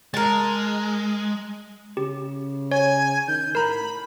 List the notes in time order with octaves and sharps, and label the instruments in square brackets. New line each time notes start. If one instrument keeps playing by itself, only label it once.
[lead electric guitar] G#3 [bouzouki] A#4 A5
[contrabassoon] C#3 [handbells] G4
[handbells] C#5 [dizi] G#5
[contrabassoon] D#3 [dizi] G6
[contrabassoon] A2 [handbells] A#4 A#5 [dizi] B5